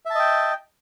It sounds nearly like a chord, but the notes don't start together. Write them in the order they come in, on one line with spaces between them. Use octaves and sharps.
E5 A5 D#5 G5